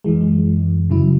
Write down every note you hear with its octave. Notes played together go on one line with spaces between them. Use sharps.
F#2 E3 G#3
C#3 F#3 E4